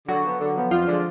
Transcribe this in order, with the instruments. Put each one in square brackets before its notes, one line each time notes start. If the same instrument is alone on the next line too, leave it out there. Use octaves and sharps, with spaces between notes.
[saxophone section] D3 [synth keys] F#3 F#4
[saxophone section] F3 B3
D3
F3 B3
[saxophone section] F2 [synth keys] F3 F4
[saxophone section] D3 G#3 D4